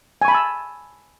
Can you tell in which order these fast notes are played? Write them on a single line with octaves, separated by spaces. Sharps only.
G#5 C#6 B5 A5 E6